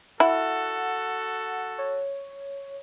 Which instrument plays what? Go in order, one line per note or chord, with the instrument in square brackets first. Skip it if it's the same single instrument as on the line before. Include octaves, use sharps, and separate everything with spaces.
[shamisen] E4 [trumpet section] F#4 A4 [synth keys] F#5
[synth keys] C#5